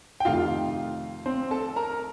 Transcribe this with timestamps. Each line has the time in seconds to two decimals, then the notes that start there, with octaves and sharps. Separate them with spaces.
0.20 G5
0.25 F2 C3 D#3 A3 D#4 F4 F5
1.26 C4 C5
1.51 A4 A5
1.76 A#4 A#5